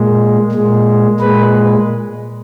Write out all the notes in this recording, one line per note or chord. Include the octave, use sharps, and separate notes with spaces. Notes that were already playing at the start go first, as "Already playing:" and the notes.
Already playing: A#2 G#3
A#2 G#3
A#2 G#3 B4